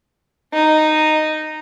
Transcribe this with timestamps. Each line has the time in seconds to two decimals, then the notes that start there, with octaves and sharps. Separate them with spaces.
0.53 D#4